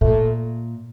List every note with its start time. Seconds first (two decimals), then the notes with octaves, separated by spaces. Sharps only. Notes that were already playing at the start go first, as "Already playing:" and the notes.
0.01 A#2 A3